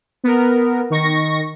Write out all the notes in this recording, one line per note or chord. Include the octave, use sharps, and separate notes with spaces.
B3 A#4
D#3 C#6 A#6